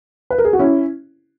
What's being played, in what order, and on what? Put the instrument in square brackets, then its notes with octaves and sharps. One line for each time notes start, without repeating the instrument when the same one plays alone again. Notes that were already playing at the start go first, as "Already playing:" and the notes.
[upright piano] B4
A#4
G#4
F#4
C#4 E4